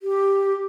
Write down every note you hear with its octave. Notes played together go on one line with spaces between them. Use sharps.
G4